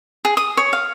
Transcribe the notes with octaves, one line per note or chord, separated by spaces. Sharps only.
G#4
D#6
C#5
F5